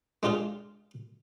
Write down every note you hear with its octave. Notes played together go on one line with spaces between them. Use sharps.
G#3 D4 F4 G4 G#4